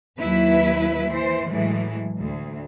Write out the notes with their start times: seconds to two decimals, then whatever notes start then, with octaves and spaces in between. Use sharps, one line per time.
0.18 D#2 F#3 E4 B4
1.08 E3 C5
1.50 A2 E3 F#3 G#3 A3
2.19 D2